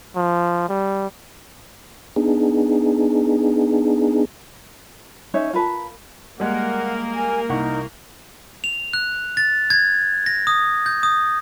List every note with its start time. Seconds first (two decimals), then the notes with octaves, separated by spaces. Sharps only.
0.16 F3
0.69 G3
2.16 B3 D4 D#4 G#4
5.34 C#4 D#4 C#5 E5
5.53 F4 A#4 B4 A5
6.40 G3 G#3 A#3 A#4 F#5
7.15 G#5
7.49 C2 D#4 F#5 C#6
8.64 F7
8.93 F#6
9.37 A6
9.70 G#6
10.26 A#6
10.47 D#6
10.86 G6
11.03 D#6